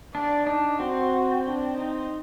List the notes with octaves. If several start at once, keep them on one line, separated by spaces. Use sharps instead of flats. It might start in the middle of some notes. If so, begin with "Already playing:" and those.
D4 D5
D4 D#4
C4 F#4
D4
D#4